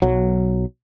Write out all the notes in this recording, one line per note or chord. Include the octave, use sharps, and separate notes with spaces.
B1 F#3